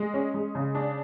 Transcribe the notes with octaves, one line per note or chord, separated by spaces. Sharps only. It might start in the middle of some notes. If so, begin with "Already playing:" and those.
Already playing: G#3
C#4
G#3
C#3
D4